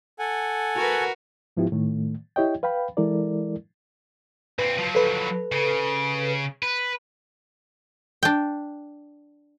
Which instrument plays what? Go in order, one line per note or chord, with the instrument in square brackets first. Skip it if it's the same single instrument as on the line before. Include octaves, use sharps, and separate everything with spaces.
[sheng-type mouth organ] A4 F#5 G#5
[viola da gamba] F#4 A#4 B4
[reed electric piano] G#2 F3 B3 E4 F4 G4
A2 D#3 A3
E4 G4 C#5 D#5 G5
B4 F5 G5 B5
E3 G#3 E4 A4 A#4 D5
[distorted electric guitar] A#2 C4 [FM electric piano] B4
[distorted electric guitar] F3 F#3
[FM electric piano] A4 B4
[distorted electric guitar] C#3
B4
[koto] D4 G5